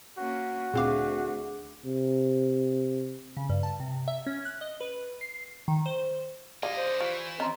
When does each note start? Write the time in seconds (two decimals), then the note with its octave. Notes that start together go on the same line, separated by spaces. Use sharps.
0.18 A#3 C#4 F#4
0.74 D2 A#2 C4 G#4 F5 D6
1.86 C3
3.37 C#3
3.49 G2
3.63 A5
3.80 C3
4.08 E5
4.26 C#4
4.45 F#6
4.61 D#5
4.81 B4
5.21 C7
5.68 D#3
5.86 C5
6.63 D3 G4 G#4 D5 D#5 F5
6.77 C5
7.00 E3 F4 C#6
7.40 C4 C#4 D#5 A#5 C6